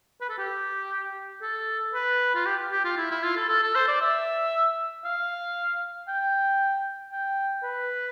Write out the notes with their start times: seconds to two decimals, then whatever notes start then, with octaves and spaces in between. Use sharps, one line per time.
0.21 B4
0.30 A4
0.38 G4
1.42 A4
1.94 B4
2.35 F4
2.46 G4
2.72 G4
2.85 F4
2.97 E4
3.11 E4
3.24 F4
3.37 A4
3.49 A4
3.63 A4
3.75 C5
3.88 D5
4.02 E5
5.05 F5
6.08 G5
7.12 G5
7.64 B4